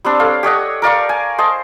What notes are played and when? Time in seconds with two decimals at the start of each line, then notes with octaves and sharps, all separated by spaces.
0.05 G3 C4 D4
0.20 A4 C#5 F5
0.43 G4 C#5 D#5 F#5
0.82 A#4 D5 F5 C#6
1.09 G#5
1.38 C5 D#5 A5